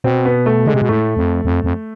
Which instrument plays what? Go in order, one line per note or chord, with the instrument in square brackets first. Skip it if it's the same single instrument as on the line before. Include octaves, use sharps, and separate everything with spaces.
[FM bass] B2 [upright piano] C4
[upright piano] B3
A3
[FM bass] D3 [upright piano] G#3
[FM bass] C3
B2
[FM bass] A2 [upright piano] A3
[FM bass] F2
F2
F2